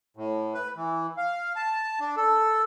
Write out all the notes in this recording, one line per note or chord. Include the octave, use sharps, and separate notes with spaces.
A2
B4
E3
F5
A5
D4
A4